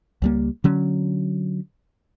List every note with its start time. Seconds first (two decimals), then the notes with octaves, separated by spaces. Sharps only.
0.22 C#2 G3 A#3
0.64 D3 F#3 C#4